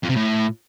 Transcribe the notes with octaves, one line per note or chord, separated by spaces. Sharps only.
F2
C3
A2